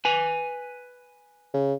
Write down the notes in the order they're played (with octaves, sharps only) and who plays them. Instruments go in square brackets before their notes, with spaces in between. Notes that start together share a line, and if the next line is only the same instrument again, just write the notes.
[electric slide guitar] B4 G#5
[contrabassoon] C#3